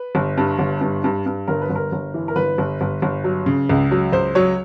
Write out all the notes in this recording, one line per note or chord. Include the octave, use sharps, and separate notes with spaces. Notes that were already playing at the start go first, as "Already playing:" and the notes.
Already playing: B4
G1
G2
G1
G2
G2
G2
G1 A#4
B4
G1
A#4
G1
E3
A#4
G1 B4
G1
G1
G1
F#3
C#3
C#2
F#3
C#2 C5
F#3 C#5